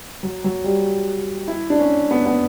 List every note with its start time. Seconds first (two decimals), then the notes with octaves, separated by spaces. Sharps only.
0.23 F#3
0.44 F#3
0.64 G3
1.48 E4
1.70 D4
1.79 C#4
2.11 B3
2.26 B3